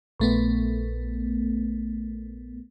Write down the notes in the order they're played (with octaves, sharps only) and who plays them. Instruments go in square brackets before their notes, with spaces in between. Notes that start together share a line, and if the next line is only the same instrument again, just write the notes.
[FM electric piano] A#1 A3 B3